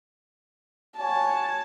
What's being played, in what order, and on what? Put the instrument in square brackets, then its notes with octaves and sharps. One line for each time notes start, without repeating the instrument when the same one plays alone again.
[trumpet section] F#4 C#5 G#5 [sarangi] A5